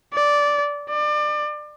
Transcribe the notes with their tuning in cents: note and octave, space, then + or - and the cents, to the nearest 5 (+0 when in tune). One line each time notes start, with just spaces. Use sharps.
D5 -10
D5 +30